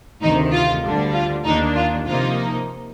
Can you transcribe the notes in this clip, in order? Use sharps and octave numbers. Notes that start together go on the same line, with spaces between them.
D2 C3 D#3 D#4
F4
D2 D3 G3 D4
F4
D#2 D#3 A#3 D4 D#4
F4
C3 F3 A#3 D#4 F4